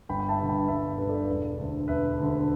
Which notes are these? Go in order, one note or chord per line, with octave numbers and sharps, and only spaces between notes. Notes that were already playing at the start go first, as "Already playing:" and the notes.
G1 G5 B5
G5
E5 A5
G2 D3
G5 B5
G1 E5 A5
G2 D3 B4
A4 D5
E1
D2 D3
E1 B4 E5
D2 D3